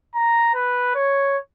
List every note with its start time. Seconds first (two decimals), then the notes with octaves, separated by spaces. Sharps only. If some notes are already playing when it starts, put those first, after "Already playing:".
0.15 A#5
0.55 B4
0.95 C#5